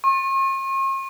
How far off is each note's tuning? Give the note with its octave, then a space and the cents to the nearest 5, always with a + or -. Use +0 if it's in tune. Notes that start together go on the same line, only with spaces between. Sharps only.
C#6 -45